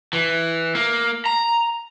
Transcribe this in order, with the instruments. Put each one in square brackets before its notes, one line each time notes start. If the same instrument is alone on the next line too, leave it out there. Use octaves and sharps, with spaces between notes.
[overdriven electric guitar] E3
A#3
A#5